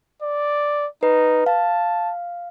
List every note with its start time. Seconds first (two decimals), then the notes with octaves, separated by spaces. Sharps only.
0.22 D5
1.03 D#4 B4
1.46 F5 A5